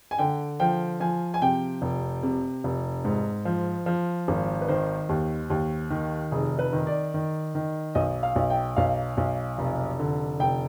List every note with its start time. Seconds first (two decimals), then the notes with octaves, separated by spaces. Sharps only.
0.11 G#5
0.18 D3 G5
0.60 F3 G5
1.00 F3 G#5
1.34 G#5
1.42 C3 G5
1.82 F1
2.23 C3
2.64 F1
3.05 G#2
3.45 F3
3.86 F3
4.28 G#1
4.61 B4
4.68 D#3 C5
5.09 D#2
5.50 D#2
5.90 D#3
6.31 F1 G#4
6.59 B4
6.73 D#3
6.87 D5
7.14 D#3
7.55 D#3
7.95 B1 D#5
8.23 F5
8.36 B1
8.50 G5
8.76 B1 F5
9.17 B1
9.59 F1
9.99 D3
10.40 F1 G5